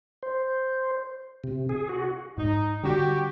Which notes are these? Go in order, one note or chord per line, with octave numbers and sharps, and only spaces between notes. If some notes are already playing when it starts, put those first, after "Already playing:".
C5
C3
G#4
F#4
G#2 D#4
D3 G3 C#4 F#4 G4